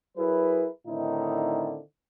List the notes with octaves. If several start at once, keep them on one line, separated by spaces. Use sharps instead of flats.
F#3 E4 G#4 A#4 B4
A2 D3 D#3 C4 D#4 E4